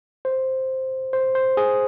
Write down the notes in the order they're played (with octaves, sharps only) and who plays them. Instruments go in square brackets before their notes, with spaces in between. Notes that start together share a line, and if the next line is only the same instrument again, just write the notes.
[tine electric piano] C5
C5
C5
G#4